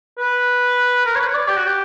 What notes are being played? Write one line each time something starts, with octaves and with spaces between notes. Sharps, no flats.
B4
A#4
C#5
B4
C#5
D5
G4
F#4
G4